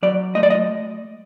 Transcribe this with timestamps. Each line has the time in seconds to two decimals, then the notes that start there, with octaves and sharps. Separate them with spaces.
0.03 F#3 D5
0.35 A3 D#5
0.43 D5
0.50 D#5